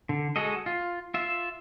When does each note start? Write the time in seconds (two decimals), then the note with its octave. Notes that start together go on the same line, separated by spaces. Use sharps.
0.09 D3
0.36 G#3 F#4 A4 D#5
0.66 F4
1.14 F4 E5